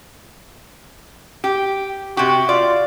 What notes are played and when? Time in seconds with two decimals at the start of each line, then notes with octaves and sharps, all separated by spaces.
1.44 G4
2.17 C3 F#4 G4
2.49 F4 D5